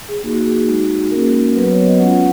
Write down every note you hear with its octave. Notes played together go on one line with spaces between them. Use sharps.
G#4
A#3 D#4 F#4 G#4
F#4
G#4
G#4
G#3 D#4 F#4
A#3 C#4 F#4 A#4
F#3 B3 F#4 B4
C#5
D#5
G#3 C#4 F4 F#5